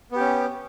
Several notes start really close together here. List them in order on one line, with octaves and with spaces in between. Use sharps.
B3 G4 C#4